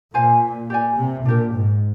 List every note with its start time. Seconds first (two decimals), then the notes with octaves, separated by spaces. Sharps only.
0.13 A#2 F4 C5 F5 G#5
0.70 G4 D5 G#5
0.98 C3
1.26 A#2 D4 G4 A#4
1.54 G#2